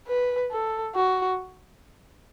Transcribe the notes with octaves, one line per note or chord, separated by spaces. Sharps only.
B4
A4
F#4